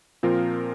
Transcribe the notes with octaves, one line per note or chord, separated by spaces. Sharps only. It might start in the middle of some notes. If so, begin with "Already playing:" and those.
A#2 F3 C4 F4 A#4